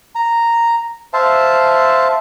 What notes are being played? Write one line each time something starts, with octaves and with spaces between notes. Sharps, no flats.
A#5
C5 E5 F5 A5